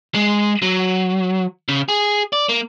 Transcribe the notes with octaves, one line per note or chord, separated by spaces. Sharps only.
G#3
F#3
C#3
G#4
D5
A#3